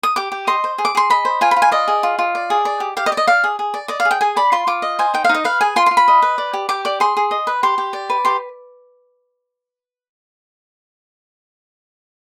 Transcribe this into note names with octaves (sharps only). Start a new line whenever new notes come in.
D#6
G4 D6
G4
D#5 C6
C5
G#4
D6
G#4 C6
D#5 B5
C5
F4 G#5
B5
F4
G#5
D5 D#5
G#4
F4
F4
D5
G#4
D5
G4
G4 F5
D#5
D5
D#5
D5 F5
G#4
G#4
D5
D5 D#5
F5
G#4
G5
G#4 G#5
D5 B5
F4 C6
F4 D6
D#5
C5 G#5
D#4 G5
F5
D#4
D#5
B4 F5
G#4 G#5
F4 C6
F4 C6
B5
D#5
B4
D5
G4
G4 D6
D5 D6
G#4 C6
G#4
D#5
B4
G4 C6
G4
D5
B4
G4 C6